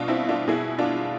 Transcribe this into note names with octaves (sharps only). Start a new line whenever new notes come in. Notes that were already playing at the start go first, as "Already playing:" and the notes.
Already playing: B2 D4 F4
C4 E4
D4 F4
B2 E4 G#4
D4 F4